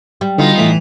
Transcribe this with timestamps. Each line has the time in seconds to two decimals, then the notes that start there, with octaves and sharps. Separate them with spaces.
0.21 G3
0.38 D3 B3 D#4 F4 F#4
0.58 A2 E3 A3